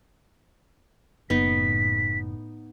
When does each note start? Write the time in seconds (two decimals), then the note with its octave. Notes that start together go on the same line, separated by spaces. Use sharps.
1.30 F#1 A2 B3 D#4 B6